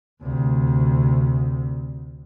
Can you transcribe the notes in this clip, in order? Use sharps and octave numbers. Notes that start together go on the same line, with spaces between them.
D2 C3